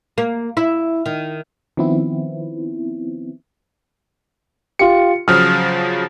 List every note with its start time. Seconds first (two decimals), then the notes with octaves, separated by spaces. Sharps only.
0.18 A#3
0.57 E4
1.06 D#3
1.77 D#3 F3 B3 C4 E4
4.79 F4 G4 C#7
5.28 C#3 F3 F#3 D#6 F6